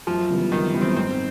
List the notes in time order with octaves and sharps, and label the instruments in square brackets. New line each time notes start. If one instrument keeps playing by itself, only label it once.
[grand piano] F#2 [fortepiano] F3
[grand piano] C#3 E3 G3 B3
[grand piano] F#2 [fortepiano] D#3
[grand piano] C#3 E3 G3 B3
[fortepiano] C4
[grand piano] G#2 [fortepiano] C4